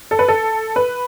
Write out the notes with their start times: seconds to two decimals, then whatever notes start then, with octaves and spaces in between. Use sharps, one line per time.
0.11 A4
0.19 B4
0.28 A4
0.76 B4